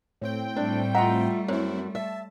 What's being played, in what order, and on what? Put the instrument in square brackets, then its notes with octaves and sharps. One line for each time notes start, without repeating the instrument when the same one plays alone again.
[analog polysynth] A2 C4 G5 [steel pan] C#5
[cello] G3 A3 [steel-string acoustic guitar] D4
[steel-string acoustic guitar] F4 E5 [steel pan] D#5 F#5 A#5
[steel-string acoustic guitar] F#2 [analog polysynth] C4 E4 [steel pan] C#5
[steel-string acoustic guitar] E5 [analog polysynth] A5